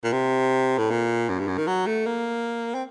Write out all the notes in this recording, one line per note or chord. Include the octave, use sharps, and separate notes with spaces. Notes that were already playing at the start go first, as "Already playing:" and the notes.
A#2
C3
A2
A#2
F#2
G2
F#2
D#3
F#3
A3
A#3
C4